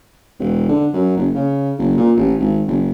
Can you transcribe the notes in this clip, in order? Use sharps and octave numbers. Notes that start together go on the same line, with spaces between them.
E1
D3
F#2
F#1
C#3
F#1
A#2
A1
G#1
F#1